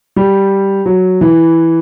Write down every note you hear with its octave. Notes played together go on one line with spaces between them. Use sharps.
G3
F#3
E3